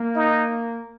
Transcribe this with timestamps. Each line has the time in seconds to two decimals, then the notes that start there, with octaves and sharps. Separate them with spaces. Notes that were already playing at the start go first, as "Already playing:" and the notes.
Already playing: A#3
0.15 D#4